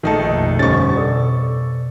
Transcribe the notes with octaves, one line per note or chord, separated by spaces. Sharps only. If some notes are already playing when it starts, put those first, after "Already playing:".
A#1 D#3 A3 D#4 A4
F2 B2 D#5
G1 C#4 G4 C5 C#6 A6
B2 A4 D5